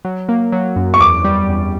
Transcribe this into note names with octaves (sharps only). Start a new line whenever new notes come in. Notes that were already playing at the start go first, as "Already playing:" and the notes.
F#3
A#3
F#3
F#2
C#6
E2 D6
G3
E2